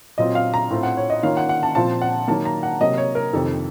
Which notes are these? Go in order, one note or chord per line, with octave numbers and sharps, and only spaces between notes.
A#2 F#3 C4 F4 D#5
F5
A#5
A2 A3 C4 F4
F#5
C#5
D#5
D#3 A#3 C#4 F4 F5
F#5
F#5
A5
A#2 F3 C4 F4 A5
F#5
D#3 F#3 A#3 A5
A#5
F#5
C3 F#3 A#3 D#5
C#5
A#4
F2 C3 D#3 A4